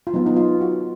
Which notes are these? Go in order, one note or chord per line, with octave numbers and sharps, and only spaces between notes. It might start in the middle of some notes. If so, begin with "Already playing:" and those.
F4
F#3 B3 D#4
D#4
F4
F#4